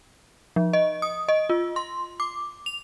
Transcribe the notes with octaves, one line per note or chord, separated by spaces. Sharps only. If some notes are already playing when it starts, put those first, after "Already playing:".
F3
D#5
D#6
D#5
F4
C6
D6
F7